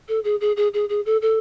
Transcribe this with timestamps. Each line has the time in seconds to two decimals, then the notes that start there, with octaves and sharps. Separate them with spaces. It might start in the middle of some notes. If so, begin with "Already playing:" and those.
0.08 A4
0.24 G#4
0.41 G#4
0.57 G#4
0.74 G#4
0.89 G#4
1.06 A4
1.22 A4